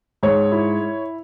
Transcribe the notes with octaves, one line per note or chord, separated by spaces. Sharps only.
G#2 C#5
E4